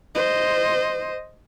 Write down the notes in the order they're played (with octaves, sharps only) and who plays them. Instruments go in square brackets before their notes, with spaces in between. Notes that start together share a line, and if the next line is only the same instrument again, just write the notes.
[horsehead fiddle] C5 D#5